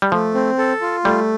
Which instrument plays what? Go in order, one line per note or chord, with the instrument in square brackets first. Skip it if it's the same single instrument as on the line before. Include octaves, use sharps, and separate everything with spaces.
[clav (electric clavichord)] G3
[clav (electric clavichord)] F3 [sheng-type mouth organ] A3
[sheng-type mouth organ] C4
A4
F4
[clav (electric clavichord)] G3 [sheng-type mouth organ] A3